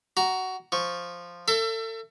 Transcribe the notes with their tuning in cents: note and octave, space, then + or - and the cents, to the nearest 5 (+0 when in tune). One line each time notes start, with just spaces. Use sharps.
F#4 +15 A#5 +0
F3 +0 C#6 +0
A4 +35 E5 +30